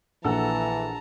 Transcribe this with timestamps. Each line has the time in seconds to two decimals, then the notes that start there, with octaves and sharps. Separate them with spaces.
0.25 A#1 E3 A4 F#5 A5 A#5 E6